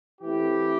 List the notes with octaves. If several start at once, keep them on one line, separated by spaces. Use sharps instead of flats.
E3 A3 C4 E4 G4